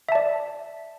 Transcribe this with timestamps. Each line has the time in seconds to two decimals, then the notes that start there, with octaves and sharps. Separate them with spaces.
0.09 E5
0.12 A5
0.15 D5